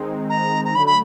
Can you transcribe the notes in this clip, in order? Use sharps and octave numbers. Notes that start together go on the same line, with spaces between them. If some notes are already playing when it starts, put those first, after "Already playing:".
Already playing: D#3 G#3 C4 D#4
A#5
A#5
D3 F#3 A3 B5
B5